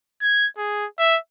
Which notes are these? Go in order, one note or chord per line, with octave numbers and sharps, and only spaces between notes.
G#6
G#4
E5